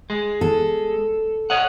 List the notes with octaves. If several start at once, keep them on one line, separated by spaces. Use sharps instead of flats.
G#3
A4
C#5 D#5 F#5